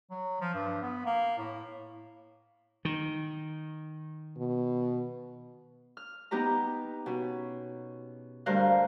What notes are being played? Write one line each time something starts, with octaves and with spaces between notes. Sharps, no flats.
F#3
F3
G2
B3
A#3
A2
D#3
B2
F6
B3 D#4 G4 B4 A#5
B2 C#4
D2 G2 A#4 C5 F5 F#6